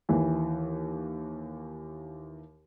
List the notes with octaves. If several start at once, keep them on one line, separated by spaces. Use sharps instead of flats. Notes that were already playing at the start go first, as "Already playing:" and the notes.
D#2 E3